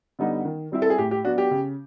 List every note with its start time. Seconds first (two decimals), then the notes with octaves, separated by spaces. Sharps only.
0.19 D3 G3 B3 D#4
0.45 D#3
0.72 G3 C4 E4
0.82 A4
0.90 G#4
0.98 A2 G4
1.11 G4
1.24 F#3 B3 D4 F#4
1.38 G4
1.51 C#3